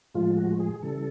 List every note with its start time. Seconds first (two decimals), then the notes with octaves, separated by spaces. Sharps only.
0.14 A2 F3 G#3 F4
0.37 F#4
0.60 G#4
0.83 C#3 E3 G3 A4